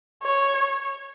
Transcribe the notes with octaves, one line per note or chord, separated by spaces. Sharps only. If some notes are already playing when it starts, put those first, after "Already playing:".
C#5